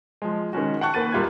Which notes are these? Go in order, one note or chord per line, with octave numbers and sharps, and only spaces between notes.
F3 G#3
D#3 G#3 C#4 F#4
F#5 G5 A5 C#6 F#6
D#2 A#3 B4 A6 D#7
E1 G3 F4 G4 G#6